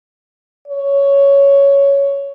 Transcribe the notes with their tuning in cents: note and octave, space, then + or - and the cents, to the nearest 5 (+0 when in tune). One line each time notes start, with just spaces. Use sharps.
C#5 +5